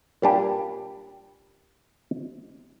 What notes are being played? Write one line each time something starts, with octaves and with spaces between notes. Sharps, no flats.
A#2 G3 D4 G4